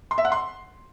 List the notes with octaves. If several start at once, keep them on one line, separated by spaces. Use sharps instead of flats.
C6
E5
F#5
C6